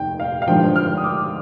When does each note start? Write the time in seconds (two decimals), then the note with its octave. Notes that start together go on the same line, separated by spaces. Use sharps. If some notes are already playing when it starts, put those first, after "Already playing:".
Already playing: F1 D#2 D#3 G5
0.20 F5
0.42 F5
0.48 G#1 G2 D3 F3 G5
0.76 F6
0.97 D#6
1.04 D6